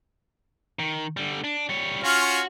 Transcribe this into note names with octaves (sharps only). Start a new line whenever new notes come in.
D#3
D3 G3
D4
G3 C#5
C#4 F4 F#4 F5